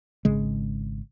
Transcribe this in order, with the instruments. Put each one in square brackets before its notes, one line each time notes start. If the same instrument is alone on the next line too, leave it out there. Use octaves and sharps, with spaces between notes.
[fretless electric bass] G#1 C#3 G#3